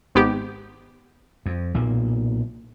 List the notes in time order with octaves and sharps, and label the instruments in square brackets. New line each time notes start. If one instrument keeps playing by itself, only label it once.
[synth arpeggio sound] G#1 B3 G4
[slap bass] F2
B1 A#2 A#3